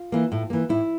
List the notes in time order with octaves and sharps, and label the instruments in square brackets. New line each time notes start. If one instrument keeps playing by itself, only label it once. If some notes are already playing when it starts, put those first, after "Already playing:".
Already playing: [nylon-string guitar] F4
E3 A#3
A2
E3 A#3
A2 E4